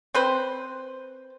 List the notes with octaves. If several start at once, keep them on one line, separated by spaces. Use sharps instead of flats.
C4 B4 C5